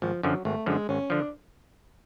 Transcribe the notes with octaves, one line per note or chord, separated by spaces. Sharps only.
G#1 F3
F#2 D3 F3 F#3
G#1 A3
F#2 D3 F3 G#3
G#1 C#4
D3 F3 D4